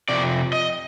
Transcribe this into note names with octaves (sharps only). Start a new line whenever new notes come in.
F2 C3 D5
D#5